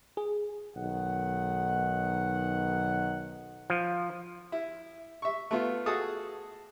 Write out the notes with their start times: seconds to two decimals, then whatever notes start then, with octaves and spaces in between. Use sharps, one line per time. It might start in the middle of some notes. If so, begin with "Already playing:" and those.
0.17 G#4
0.76 B1 D#3 F#5
3.70 F3
4.52 E4
5.22 E5 C#6
5.51 A3 B3 F4
5.86 F#4 G#4 A4 A5 D#6